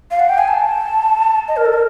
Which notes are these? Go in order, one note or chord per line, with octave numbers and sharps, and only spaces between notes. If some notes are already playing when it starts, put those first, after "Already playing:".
F5
F#5
G5
G#5
A5
D#5
A#4
A4
A#4